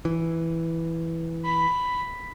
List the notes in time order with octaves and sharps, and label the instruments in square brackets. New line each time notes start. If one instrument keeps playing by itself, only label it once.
[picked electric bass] E3
[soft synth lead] B5